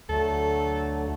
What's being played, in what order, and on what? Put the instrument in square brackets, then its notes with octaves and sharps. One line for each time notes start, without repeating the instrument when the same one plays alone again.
[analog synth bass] D2 [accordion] D3 F#3 A3 [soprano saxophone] A4